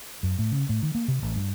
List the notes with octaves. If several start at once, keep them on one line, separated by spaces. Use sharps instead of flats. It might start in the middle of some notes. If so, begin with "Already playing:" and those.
F#2
A2
C#3
A2
D#3
A#3
C3
A1
G2